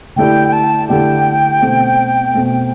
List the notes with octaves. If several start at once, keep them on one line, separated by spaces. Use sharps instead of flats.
D3 A3 E4 G4 D5 G5
G5
A5
D3 A3 E4 G4 D5 G5
B2 A3 C4
B2 A3 C4